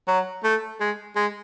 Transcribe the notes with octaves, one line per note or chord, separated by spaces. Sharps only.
F#3
A3
G#3
G#3